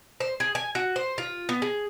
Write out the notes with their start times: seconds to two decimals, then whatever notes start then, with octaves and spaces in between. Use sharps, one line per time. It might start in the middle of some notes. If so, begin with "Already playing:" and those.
0.20 C5
0.40 G#4
0.55 G#5
0.75 F#4
0.96 C5
1.18 F4
1.49 B3
1.62 G#4